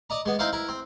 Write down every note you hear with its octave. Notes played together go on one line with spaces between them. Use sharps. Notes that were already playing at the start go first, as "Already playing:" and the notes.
D5 D#5 A#5
G#3 B3
C4 D#4 E4 C5 F5
E4 A#4
C4